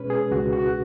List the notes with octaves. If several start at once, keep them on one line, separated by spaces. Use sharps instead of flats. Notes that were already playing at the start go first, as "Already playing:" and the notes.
Already playing: B2 G#3 C#4 G#4 B4
G#4
C#2 F#4
F#4